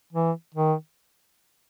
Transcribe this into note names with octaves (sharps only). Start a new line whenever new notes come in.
E3
D#3